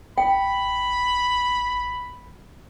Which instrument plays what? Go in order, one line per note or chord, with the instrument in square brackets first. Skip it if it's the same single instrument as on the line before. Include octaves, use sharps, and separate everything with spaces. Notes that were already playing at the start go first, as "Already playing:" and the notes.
[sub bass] A1 [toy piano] G5 [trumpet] B5